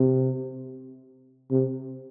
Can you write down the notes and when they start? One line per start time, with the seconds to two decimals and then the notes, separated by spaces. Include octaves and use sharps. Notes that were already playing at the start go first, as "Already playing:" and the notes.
Already playing: C3
1.51 C3